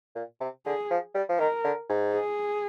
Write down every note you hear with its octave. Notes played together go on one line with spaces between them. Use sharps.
A#2
C3
D3 G#4
F3
G3
F3
D#3 A#4
D3
G#2
G#4